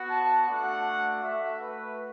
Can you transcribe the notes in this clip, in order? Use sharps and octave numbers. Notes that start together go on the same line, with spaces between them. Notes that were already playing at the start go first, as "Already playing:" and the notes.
Already playing: B3 F#4
A5
A3 D4 F#4 F#5
A3 F#4 E5
B4